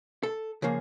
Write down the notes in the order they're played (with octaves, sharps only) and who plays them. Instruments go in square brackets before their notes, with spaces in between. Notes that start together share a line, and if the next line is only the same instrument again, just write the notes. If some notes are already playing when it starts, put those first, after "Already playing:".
[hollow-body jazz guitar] A4
C#3 F3 A#3 G#4